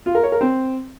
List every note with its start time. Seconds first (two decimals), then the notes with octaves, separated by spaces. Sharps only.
0.06 F4
0.15 A#4
0.23 C#5
0.32 A#4
0.41 C4